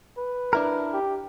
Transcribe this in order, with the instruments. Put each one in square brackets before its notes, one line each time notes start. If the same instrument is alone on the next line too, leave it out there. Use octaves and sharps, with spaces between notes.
[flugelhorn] B4
[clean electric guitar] D4 E4 A#4
[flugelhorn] G4